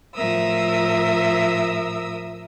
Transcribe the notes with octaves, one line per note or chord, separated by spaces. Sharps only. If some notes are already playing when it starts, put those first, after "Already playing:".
A2 F3 A#4 E5 D#6 E6